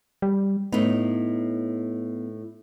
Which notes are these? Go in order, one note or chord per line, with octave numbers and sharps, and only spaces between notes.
G3
A2 B3 D#4